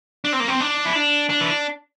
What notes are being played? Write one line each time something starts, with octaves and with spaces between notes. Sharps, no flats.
D4
C4
A#3
C4
D4
E4
D4
D4
E3